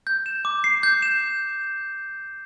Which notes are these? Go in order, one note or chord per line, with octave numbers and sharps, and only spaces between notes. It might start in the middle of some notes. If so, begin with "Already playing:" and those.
G6
E7
D6
C7
G6
E7